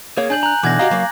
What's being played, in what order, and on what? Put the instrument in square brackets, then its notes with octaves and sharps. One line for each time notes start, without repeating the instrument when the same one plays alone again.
[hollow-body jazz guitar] A#3 [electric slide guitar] G#4 C#5
[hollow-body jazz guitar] D4 [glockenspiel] G#5 G6 F#7
[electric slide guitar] A#5 [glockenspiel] F#6 F#7
[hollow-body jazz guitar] B2 [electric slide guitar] D3 E3 [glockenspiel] D6 G#6 A#6
[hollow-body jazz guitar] F#4 G4 D#5 [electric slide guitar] F5 [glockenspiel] A#5
[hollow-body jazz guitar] F#3 A#3